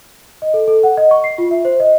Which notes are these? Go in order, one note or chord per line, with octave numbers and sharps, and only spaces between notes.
D#5
A4
A4
F#5
D#5
C#6
C7
F4
E5
C5
D#5